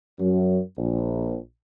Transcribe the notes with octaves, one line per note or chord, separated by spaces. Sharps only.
F#2 F#3
A#1